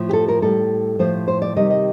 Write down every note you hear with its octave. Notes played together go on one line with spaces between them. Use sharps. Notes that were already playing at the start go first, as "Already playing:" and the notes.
Already playing: A2 F3
G4
A4
A#4
A2 G3 A4
A2 F3 C5
C5
D5
C3 D#3 G3 D#5
D#5